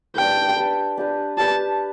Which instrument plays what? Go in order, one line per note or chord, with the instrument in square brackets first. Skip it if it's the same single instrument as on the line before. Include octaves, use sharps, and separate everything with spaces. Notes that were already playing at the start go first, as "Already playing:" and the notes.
[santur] D4 G4 B4 [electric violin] G5
[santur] D4 G4 B4
D4 G4 B4
[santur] D4 G4 B4 [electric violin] A5